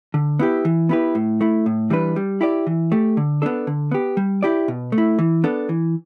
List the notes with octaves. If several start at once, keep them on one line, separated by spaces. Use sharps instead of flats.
D3
B3 E4 G4
E3
B3 E4 G4 B4
A2
A3 E4
A2
E3 G3 D4 B4
G3
E4 G4 D5
E3
A3 G4
D3
B3 D4 A4
D3
B3 G4
G3
E4 G4 D5
B2
A3
E4
E3
B3 D4 A4
E3